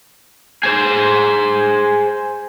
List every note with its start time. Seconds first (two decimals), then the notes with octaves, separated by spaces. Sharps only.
0.63 G#4 C5